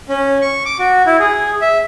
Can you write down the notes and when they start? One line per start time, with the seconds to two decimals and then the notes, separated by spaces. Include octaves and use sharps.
0.09 C#4
0.42 C#6
0.65 D6
0.79 F#4
1.06 E4
1.19 G#4
1.61 E5